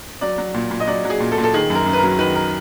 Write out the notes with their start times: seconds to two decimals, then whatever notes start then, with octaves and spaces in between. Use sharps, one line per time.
0.21 F#3 D5
0.38 F#3
0.54 A#2
0.71 A#2
0.80 D#5
0.87 F#3 D5
1.05 F#3
1.10 G#4
1.20 A#2
1.32 A4
1.38 A#2
1.44 A4
1.54 D#3 G#4
1.70 F#2
1.75 A#4
1.86 F#2
1.93 B4
1.98 A#4
2.03 F#3
2.19 D#3 B4
2.35 A#4